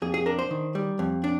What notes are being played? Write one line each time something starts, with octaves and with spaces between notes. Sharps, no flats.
F2 G#4
G#4
D4 A#4
C5
D#3
G3
F2
D4